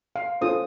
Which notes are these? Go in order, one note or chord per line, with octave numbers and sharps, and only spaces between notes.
F5
C#4 F4 A4 C5 D#6